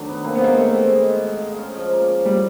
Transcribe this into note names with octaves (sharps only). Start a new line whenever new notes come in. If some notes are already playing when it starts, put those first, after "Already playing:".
Already playing: D#3 F#3 A3 D4
B3
A#3 C4
B3
G#3 A#3
A3 C4
C4
G#3
G#3
G#3
G#3
C#4
F3
A#3
F3
G3 C#4